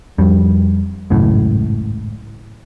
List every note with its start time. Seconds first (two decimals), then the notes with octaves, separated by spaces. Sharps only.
0.18 F2 G3
1.10 G#1 C#2 F#2 A2